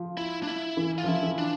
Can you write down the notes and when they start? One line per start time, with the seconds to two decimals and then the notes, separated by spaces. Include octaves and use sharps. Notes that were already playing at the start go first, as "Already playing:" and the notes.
Already playing: F3
0.17 E4
0.43 D4
0.48 E4
0.77 E3
0.98 F4
1.04 F3
1.08 E3 E4
1.23 E3
1.38 D4